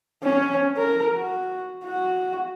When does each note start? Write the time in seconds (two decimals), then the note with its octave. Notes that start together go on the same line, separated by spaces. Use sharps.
0.23 C#4
0.77 A#4
1.15 F#4
1.84 F#4